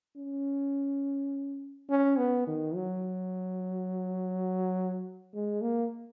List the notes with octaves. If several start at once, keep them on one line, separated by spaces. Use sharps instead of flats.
C#4
C#4
B3
D#3
F#3
G#3
A#3